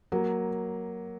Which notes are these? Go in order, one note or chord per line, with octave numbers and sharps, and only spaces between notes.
F#3 A#3